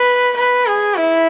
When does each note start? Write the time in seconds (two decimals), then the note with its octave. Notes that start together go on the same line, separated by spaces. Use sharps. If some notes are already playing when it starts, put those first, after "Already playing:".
Already playing: B4
0.37 B4
0.67 G#4
0.97 E4